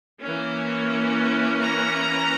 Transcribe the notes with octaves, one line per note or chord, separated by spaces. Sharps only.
E3 A#3 C#4
A#5